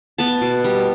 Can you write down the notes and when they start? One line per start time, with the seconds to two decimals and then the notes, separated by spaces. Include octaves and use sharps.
0.18 B3 A5
0.41 B2
0.64 G3